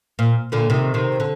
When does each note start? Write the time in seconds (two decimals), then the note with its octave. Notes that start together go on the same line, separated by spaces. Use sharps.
0.19 A#2
0.52 A#2 D3
0.70 C3 D#3
0.94 C3 D#3
1.20 D3